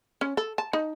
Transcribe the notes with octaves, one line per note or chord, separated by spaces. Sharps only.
C#4
A4
A5
D#4